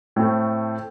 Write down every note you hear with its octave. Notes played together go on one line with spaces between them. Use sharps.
A2 A3 C4